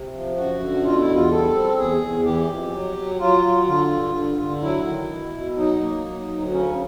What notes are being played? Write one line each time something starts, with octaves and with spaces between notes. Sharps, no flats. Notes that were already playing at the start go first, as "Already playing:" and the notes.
Already playing: C3
F3
F#2 F#4
D3
B2 F4
E4
E2
F4
G3 A4
C4
E2 G#4
E2
E3 G4
F2
F#3
F#3
F#3 F4
F#3
D3 F4
G2
D3
D3
F#3 E4
D#3
B2
B2
F#3 D#4
A#3
F#3
D2
C#3 C#4